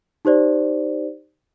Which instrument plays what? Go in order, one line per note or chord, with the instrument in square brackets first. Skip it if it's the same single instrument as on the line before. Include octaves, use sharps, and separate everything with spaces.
[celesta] D#4 G4 C5 D5